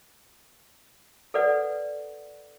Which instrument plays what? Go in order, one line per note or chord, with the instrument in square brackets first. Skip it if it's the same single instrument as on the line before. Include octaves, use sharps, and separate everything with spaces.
[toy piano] A4 B4 D5 F#5